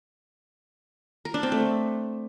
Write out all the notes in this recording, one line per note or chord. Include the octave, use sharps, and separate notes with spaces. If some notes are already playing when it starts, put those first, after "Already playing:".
A#4
D4
C4
A3